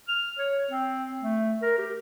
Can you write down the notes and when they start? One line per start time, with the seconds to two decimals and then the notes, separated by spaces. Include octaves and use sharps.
0.08 F6
0.39 C#5
0.71 C4
1.22 A3
1.62 A#4
1.78 G4